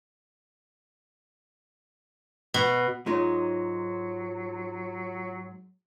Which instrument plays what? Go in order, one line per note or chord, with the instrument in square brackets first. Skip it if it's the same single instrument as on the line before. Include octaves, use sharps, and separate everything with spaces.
[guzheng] B2
[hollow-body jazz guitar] G#2 G#3 D#4 [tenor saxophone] F#3 [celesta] F4 C#5